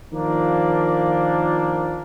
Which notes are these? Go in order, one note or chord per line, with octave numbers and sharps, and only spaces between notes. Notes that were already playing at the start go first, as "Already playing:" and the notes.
D#3 F3 A#3 D4